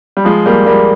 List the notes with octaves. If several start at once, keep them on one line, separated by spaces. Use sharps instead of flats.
G3
F3 G#3
G3 A#3
G3 A#3